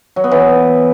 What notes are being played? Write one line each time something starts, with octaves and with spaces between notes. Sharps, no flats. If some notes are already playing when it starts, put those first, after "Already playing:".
F#3
B3
E3